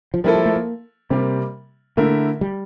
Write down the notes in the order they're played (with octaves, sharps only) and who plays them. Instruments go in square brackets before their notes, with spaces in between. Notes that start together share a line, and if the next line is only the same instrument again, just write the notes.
[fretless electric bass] F3
[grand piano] F3 A#3 E4 A4 [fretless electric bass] G3
[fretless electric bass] G3
A3
A#3
[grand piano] C3 G3 A#3 [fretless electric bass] C4
[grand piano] D3 A3 E4 A#4 E5 [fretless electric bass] A#3
[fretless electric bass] G3